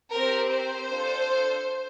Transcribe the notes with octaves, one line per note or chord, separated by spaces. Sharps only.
C4 G4 A#4
C5
D4 F4 A4